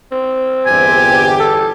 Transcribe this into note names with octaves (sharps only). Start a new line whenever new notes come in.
C4
G1 E2 G4 G#5
A4